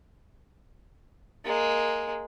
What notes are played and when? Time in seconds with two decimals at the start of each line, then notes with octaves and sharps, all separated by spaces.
1.45 G#3 A#3